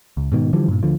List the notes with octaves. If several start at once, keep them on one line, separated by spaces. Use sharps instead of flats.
C#2
G#2 B2 D#3
D3 E3 F3 G3
G2 A#2
D2 D3 F3